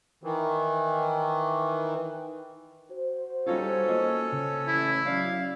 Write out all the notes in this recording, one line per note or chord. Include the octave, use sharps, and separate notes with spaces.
D#3 E3
F#4 C5
G3 C#4 D#4 F4 A4 C#5
A#3 D#5
C#3
A1 E4
F#3 C#4 D5 F5